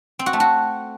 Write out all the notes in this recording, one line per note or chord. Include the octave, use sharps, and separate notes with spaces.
C4
F#4
A3
F#4